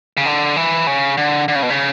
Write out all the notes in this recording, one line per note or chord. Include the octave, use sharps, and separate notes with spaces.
C#3
D3
E3
C#3
D3
D3
C#3
B2
C#3